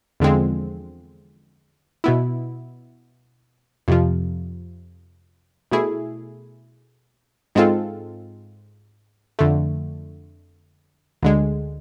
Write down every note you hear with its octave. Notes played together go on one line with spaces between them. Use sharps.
E2 D3 F3 G#3 C4
B2 B3 E4
F2 C3 F3
B2 A3 E4 G#4
G#2 G#3 C4 F4 A4
F2 D3 A3
D2 D3 G#3